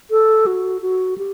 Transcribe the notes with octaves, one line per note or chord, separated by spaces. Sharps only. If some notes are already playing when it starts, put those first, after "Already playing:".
A4
F#4
F#4
G4